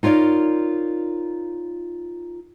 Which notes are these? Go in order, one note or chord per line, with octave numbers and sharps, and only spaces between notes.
D#4 F4 A#4 C#5 D5